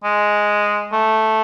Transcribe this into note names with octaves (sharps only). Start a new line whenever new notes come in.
G#3
A3